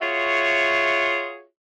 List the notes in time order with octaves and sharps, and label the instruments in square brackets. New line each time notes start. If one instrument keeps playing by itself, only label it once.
[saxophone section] F4 F#4 G#4 C#5 E5